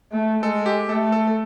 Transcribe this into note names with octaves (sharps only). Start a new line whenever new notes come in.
A3
G#3 A4
G4
A3 A4
A4
A4